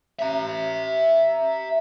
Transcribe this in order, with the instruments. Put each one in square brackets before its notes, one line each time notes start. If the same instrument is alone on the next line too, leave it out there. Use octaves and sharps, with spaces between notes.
[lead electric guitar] E5 A#5